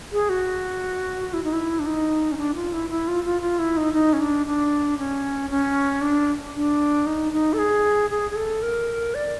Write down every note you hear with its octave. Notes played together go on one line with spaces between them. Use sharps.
G#4
F#4
E4
D#4
E4
D4
D#4
C#4
D4
F4
E4
E4
F4
F4
F4
E4
D#4
D#4
C#4
D4
D4
C#4
C#4
D4
D4
D#4
D#4
A4
G#4
G#4
G#4
A4
A#4
D5